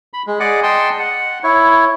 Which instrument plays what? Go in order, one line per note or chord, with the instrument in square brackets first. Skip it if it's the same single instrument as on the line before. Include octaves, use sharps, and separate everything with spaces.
[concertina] B5
G#3
G#4 D5 D#5 F#5
D#5 G5 A5 C6
F#5
E4 C#5